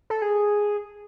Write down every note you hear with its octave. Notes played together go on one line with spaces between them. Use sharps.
A4
G#4